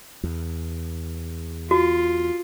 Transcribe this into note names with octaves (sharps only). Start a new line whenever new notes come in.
E2
F4 F#4